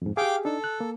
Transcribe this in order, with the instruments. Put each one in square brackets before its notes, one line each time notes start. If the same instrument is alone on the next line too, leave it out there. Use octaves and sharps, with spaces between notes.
[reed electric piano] F2 G#2
[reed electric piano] G4 G#4 [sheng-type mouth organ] F5 G5 D6
[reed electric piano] D4 D#4 [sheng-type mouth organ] A4
[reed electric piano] F#6
A#3